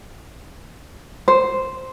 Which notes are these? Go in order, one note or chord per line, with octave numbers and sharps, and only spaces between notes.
C5